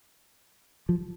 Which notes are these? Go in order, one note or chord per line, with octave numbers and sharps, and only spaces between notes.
F3